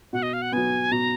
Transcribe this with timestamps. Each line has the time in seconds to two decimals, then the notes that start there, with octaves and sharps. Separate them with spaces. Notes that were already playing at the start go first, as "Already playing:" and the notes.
0.13 B2 F#5
0.23 D#5
0.33 F5
0.42 F#5
0.52 F#3 B3 G#5
0.91 B2 A#5